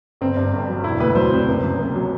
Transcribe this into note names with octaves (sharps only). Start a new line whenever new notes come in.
G1 C4
G2
G1
F#3
E1 E4
D2 B4
F#3 C5
C3
F#1
F#2
F#1
F#3